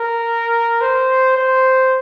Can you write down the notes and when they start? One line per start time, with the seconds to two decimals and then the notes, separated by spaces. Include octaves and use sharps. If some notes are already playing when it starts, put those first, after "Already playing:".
Already playing: A#4
0.81 C5
1.37 C5